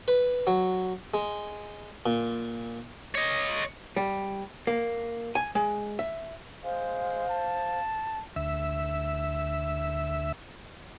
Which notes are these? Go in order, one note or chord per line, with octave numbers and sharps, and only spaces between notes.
B4
F#3
G#3
A#2
C#5 D#5
G3
A#3
G#5
G#3
E5
G#3 C5 F5
A5
D2 E5